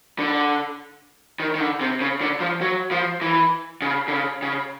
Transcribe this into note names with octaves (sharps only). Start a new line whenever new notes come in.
D3
D#3
D#3
D3
C3
C#3
D3
F3
F#3
F3
E3
C#3
D3
C#3
C#3